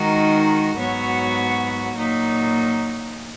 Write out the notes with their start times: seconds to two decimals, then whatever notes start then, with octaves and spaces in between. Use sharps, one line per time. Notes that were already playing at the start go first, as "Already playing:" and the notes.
Already playing: D#3 G#3 D#4 F#4 A#4
0.77 G#2 F#3 B3 F#4 C#5
1.95 A#2 F#3 A#3 D#4